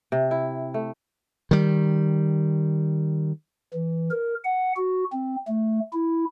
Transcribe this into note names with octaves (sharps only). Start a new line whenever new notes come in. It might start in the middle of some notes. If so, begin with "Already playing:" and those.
C3
E4
A3
D#3 G3
E3
A#4
F#5
F#4
C4
A3
E4